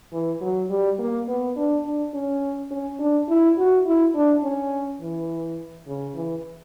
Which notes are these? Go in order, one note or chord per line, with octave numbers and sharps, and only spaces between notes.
E3
F#3
G3
A#3
B3
D4
D4
C#4
C#4
D4
E4
F#4
E4
D4
C#4
E3
C#3
E3